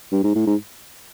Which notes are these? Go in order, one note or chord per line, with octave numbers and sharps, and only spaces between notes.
G2
G#2
A2
G#2